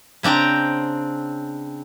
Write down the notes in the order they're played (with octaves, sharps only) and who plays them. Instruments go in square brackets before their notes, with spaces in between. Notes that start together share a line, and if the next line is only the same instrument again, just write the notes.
[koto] C#3 C4 D4 G5 A#5